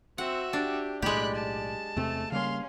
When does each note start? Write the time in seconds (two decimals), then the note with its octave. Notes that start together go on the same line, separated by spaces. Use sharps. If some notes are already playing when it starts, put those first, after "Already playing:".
0.18 C4 F#4 E5 F#5
0.53 D4 G4
1.02 B1 A2 G#3 A3 G4 D5 B5 F#6
1.35 A5
1.96 E2 C3 A3 C4
2.32 C#3 G3 A#3 C#4 F5 C6